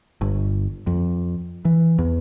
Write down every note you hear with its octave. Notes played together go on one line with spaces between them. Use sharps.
G1
F2
E3
E2